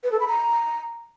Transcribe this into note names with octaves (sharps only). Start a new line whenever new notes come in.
B4
A4
B5
A#5